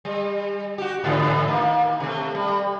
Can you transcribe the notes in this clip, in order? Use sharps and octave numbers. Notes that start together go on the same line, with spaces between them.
G3
F#4 G4
G#2 D3 E3
D#3 A#3
C3 A3
G3